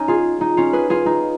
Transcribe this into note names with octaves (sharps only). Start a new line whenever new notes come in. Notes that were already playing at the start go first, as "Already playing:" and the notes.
Already playing: C#4 D#4
F4 G#4
D#4
C#4 F4
G#4 B4
F4 G#4
D#4